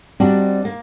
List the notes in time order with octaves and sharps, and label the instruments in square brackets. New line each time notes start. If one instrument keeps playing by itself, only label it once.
[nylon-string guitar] G3 C4 D4 D#4 F#4
A#3